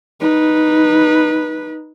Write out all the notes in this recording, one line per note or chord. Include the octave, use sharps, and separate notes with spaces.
D#4 B4